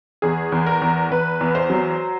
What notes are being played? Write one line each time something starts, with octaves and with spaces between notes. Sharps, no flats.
E2 G#4
E2
A#4
E2
E2 B4
E2
C5
F#3